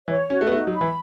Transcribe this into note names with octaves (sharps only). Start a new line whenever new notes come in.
E3 C#5
C#4 F#4
A3
B3
A3 D#4
F#3
B5
E3